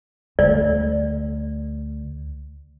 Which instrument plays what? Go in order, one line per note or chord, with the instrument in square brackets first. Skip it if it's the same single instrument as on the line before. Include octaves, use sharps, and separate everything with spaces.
[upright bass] D2 [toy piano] D5